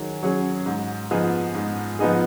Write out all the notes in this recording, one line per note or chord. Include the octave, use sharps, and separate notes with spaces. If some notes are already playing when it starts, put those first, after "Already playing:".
Already playing: D#3 F#3 G#4
F#3 C#4 G#4
G#2
F3 B3 D#4 G#4
G#2
F3 B3 D#4 G#4